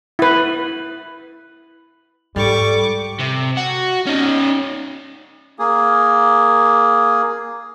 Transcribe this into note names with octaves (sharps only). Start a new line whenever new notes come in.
E4 B4
G#2 G3 A4 C#6 D6
C3
F#4
C#4 D#4
A#3 G#4